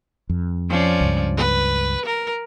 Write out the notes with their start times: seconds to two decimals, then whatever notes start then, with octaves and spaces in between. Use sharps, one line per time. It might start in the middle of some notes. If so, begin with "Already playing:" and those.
0.29 F2
0.69 F3 C#4 D5
1.01 C#2 G2
1.37 B4
2.05 A#4